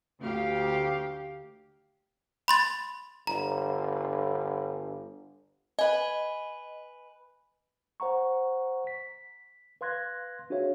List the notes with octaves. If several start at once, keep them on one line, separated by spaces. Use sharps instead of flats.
D2 G4 F5
B5 C6 A6
G1 A#5
B4 D#5 G#5
C5 F#5 A#5 C#6
B6
B4 F5 C6 F#6 G#6 A#6
D4 F#4 G#4 C#5 E5 F5